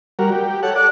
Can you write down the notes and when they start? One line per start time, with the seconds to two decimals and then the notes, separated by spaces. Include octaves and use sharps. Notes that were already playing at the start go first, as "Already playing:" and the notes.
0.19 G3 F#4 A#4
0.32 G4
0.63 A4 C#5 F#5
0.76 D5 F#6